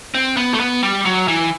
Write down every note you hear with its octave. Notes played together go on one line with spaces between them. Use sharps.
C4
B3
A3
B3
G3
F#3
E3